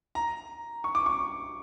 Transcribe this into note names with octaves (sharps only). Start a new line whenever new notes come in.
A#5
C#6
D6
C#6